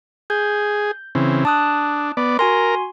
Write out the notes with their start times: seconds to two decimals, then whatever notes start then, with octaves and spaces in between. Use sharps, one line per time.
0.30 G#4 G6
1.15 C#3 E3 C4
1.45 D4 A5 D#6 F#6
2.17 B3 D5
2.39 F#4 A#4 G#5 C6